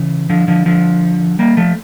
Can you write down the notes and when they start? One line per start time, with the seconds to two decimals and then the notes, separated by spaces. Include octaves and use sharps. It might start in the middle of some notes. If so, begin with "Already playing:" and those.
Already playing: C#3 E3
0.30 D3 F3
0.48 D3 F3
0.66 D3 F3
1.39 G3 A#3
1.57 F3 A3